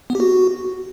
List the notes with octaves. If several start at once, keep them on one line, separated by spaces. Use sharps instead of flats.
B3
G4
F#4